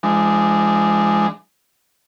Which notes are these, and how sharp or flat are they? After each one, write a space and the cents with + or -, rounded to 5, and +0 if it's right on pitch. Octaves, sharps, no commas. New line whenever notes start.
F3 -40 G#3 +0 D4 +10